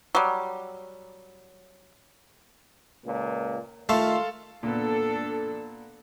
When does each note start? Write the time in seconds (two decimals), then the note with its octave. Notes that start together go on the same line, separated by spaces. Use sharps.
0.15 F#3 G3
3.05 C#2 A#2
3.89 D#3 A3 F4 A4 F5 A5 C6
4.63 A#2 B3 D4 A4